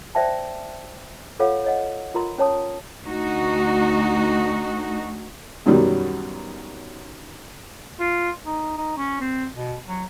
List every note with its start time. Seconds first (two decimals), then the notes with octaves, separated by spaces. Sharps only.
0.15 C5 D5 E5 G5 A5
1.39 F4 A4 C#5 F5 F#5
1.64 C#5 D#5 F#5
2.14 F4 A#4 A#5 C6
2.38 C#4 C#5 A5 D#6
3.05 D2 D#4 F#4
5.66 F#2 B2 D#3 F#3 G3
8.00 F4
8.45 D#4
8.77 D#4
8.97 C#4
9.20 C4
9.53 B2
9.86 F#3